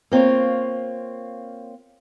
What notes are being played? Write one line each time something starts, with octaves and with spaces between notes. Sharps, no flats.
A#3 C4 F4 C#5